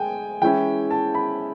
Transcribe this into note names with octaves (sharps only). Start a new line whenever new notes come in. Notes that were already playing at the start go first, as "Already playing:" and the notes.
Already playing: G#3 G5 G#5
E3 G#3 C#4 E4 G5
A5
B5